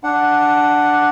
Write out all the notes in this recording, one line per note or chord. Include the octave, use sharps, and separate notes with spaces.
D4 F#5